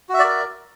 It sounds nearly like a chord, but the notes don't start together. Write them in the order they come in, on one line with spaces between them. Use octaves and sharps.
F#4 E5 D5 A#4